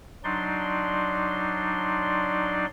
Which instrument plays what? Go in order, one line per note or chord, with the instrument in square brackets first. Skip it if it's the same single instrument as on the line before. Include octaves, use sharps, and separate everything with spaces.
[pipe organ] F#3 D4 D#4 D5 C6